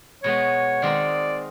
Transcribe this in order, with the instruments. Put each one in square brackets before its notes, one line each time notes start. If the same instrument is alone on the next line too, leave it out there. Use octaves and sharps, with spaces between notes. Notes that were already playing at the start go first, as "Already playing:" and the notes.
[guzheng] B2 G#3 B3 [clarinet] C#5
[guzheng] D#3 G#3 C4 D#4 [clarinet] D5